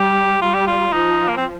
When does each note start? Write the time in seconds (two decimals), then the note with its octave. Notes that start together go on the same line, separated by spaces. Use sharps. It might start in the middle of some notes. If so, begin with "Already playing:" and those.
Already playing: G3 G4
0.41 G3 F4
0.54 G4
0.67 F4
0.93 F3 D#4
1.28 A#3
1.37 C4